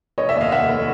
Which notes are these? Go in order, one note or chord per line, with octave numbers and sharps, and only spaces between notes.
F1 C#5 D#5
D5 E5
D#2
D#5 F5
F1 E5 F#5
F1